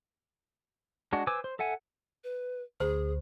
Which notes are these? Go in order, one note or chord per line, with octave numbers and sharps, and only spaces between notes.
G#3 D4 F#4
B4 C5 G#5 D6 E6
C5
A4 E5 F#5 G#5
B4
D2 G#4 C5